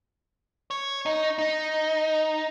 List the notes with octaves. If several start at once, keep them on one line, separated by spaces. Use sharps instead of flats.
C#5
D#4
D#4